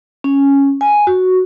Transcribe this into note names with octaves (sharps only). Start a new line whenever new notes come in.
C#4
G#5
F#4